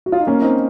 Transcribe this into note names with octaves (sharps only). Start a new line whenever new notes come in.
F#4
F4
D#4
A#3 C#4
C4 D#4